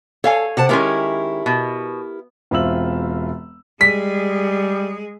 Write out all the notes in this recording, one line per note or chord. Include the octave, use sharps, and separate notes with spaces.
A4 C#5 F5 G#5
C3 F#5 A5
D#3 G#3 C#4 E4 G4 A#4
B2
E1 C4 F4 E5 E6 F#7
G3 G#3 G#4 B6